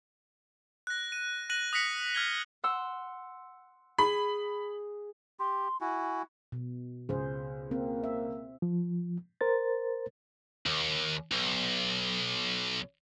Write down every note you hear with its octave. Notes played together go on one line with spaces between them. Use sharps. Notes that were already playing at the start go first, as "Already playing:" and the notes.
F#6 A#6
D#7
F#6 A#6 D#7 F#7
D#6 F#6 A#6 B6 C#7 F#7
F6 G#6 G7
F#5 C6 E6
G#4 B5
G4 C6
E4 F#4 G#5
B2
C#2 G#4 C5
A#3 C4
E5
F3
A#4 C5 A6
D#2
B1